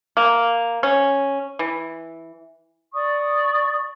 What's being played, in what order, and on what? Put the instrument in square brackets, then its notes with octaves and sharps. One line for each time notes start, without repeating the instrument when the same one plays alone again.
[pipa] A#3
C#4
E3
[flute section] D5 C#6 D#6